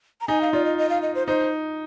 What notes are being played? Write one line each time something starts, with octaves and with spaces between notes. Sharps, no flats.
A#5
D#4 G#5
F5
F4 D5
D#5
D#5
F5
D#5
C5
D#4 C5